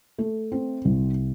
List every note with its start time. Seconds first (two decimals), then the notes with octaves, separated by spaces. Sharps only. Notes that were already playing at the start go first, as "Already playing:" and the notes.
0.18 A3
0.52 C4
0.85 C2